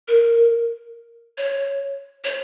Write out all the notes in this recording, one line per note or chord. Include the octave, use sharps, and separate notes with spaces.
A#4
C#5
C#5